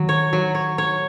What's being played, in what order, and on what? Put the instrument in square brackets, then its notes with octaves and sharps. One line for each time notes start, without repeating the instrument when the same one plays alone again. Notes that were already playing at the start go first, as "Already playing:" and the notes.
Already playing: [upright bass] D#3 [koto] F#3
[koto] C#5
F#3
C#5
C#5